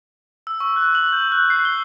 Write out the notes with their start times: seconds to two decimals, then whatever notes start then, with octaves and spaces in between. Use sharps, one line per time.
0.47 E6
0.60 C#6
0.76 F#6
0.95 F#7
1.13 G6
1.32 F#6
1.50 C7
1.65 G7